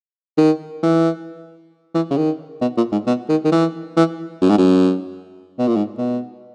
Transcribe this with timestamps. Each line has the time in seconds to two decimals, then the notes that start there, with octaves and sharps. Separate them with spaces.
0.38 D#3
0.83 E3
1.94 E3
2.11 C#3
2.17 D#3
2.61 B2
2.77 A#2
2.92 G#2
3.07 B2
3.29 D#3
3.45 D#3
3.52 E3
3.97 E3
4.42 F#2
4.50 G#2
4.58 F#2
5.59 B2
5.67 A#2
5.76 G#2
5.98 B2